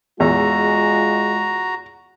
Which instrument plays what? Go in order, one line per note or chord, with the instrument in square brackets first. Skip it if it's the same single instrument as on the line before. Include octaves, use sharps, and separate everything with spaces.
[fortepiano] E2 [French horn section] G#3 F4 [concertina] F#4 A#5